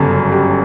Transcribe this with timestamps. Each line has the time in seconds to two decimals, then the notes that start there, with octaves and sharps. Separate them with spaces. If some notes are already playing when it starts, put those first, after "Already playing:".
Already playing: G1 F#2 C#3 G3 A4
0.32 G4